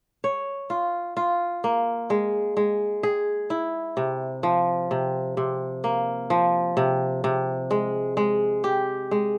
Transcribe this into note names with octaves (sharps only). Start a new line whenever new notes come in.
C#5
F4
F4
A#3
G#3
G#3
G#4
E4
C3
F3
C3
C3
A#3
F3
C3
C3
G#3
G#3
G4
G#3